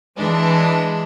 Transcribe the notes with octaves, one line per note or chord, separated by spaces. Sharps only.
E3 G#3 D4